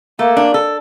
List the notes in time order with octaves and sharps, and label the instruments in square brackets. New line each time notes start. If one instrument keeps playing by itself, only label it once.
[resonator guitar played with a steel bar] A3 [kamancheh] A#3
[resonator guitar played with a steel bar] D4
A4